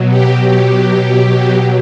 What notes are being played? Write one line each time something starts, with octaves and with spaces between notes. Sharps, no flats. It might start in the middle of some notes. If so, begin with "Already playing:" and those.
Already playing: B2 F#3
G4
B2 F#3 G4
B2 F#3